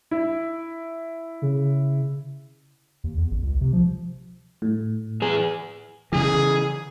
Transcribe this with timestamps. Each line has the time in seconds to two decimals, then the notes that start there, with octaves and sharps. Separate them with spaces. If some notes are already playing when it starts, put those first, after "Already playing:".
0.11 E4
1.42 C#3
3.04 D#2
3.18 E2
3.31 A1
3.43 C#2
3.61 C3
3.73 F3
4.62 A2
5.22 E2 G#4
6.12 C#3 E3 G#4